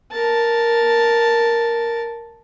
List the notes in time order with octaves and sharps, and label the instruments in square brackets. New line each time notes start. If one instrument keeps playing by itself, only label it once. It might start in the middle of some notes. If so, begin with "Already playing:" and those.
[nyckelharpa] A#4 A5